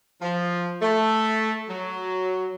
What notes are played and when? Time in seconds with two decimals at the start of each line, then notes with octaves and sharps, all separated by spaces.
0.22 F3
0.82 A3
1.69 F#3